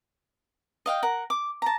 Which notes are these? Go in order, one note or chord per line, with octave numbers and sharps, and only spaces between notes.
D#5 F5 G5
A#4 F#5
D6
A5 A#5